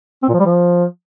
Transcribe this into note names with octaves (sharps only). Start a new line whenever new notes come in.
C4
A#2
F3
G3
F3